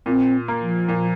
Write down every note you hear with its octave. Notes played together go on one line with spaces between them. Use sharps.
A#2 C4
A#3
F3
A#2